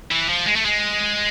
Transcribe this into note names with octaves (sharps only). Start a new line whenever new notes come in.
E3
F3
G#3
A3
G#3